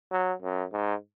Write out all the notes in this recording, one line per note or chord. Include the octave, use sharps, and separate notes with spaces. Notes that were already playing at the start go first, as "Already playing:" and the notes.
F#3
F#2
G#2